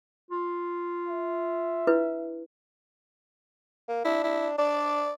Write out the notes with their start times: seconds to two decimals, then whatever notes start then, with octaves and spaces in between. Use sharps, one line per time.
0.31 F4
1.08 E5
1.87 D4 E4 B4
3.88 A#3
4.05 D4 E4
4.24 E4
4.59 D4 D5